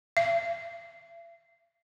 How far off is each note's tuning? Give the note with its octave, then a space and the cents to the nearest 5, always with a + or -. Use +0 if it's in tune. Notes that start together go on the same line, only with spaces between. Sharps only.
E5 +45